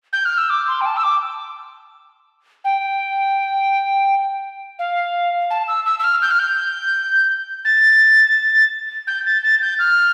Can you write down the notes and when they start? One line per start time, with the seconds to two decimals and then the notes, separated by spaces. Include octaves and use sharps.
0.13 G6
0.25 F6
0.38 E6
0.50 D6
0.68 C6
0.81 G5
0.86 A5
0.96 E6
1.03 D6
2.64 G5
4.79 F5
5.50 A5
5.68 E6
5.86 E6
5.99 E6
6.04 F6
6.22 G6
6.31 F6
6.39 G6
7.65 A6
9.07 G6
9.26 A6
9.43 A6
9.62 G6
9.79 F6